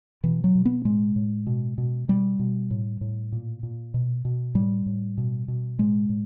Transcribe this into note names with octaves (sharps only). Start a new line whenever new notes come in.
B2 E3
F#3
B2
B3
A2 G#3
A2
B2
B2
B2 G3
B2
A2
A2
A#2
A#2
B2
B2
A2 G3
A2
B2
B2
A2 G#3
A2